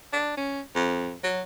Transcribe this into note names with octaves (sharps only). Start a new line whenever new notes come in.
D4
C#4
F2
F#3